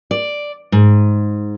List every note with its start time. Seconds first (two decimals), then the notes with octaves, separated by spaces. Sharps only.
0.11 D5
0.72 G#2